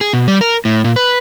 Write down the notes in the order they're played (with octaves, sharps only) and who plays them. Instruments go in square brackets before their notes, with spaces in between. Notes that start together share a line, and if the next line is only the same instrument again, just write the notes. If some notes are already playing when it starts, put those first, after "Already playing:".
[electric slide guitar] G#4
B2
G3
A#4
A2
A#2
B4